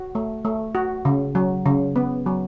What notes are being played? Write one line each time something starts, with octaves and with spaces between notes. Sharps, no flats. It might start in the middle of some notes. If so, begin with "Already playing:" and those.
Already playing: F#4
A3
A3
F#4
C#3
F#3
C#3
B3
F#3